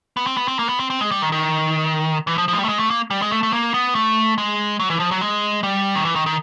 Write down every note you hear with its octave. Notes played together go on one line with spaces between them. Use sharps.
B3
C4
B3
C4
A#3
B3
C4
C4
G#3
G3
D#3
D#3
E3
F3
F3
G#3
G3
A3
G#3
A3
A#3
G3
G#3
A3
A3
A#3
B3
A3
G#3
F#3
E3
F3
F#3
G#3
G3
D#3
E3
D#3
D#3